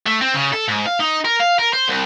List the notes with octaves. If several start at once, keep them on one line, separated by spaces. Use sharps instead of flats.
A3
C4
C#3
A4
G#2
F5
D#4
A#4
F5
A#4
C5
C2